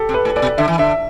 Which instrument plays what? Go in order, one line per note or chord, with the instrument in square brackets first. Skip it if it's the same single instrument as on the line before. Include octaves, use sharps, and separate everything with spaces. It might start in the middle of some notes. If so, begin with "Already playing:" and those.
Already playing: [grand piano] G4 A4
[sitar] C3
[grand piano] B4
[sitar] A2
[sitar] A2 [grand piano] D5
[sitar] B2
[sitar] D3 [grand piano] E5
[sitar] E3
[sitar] D3 [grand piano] E5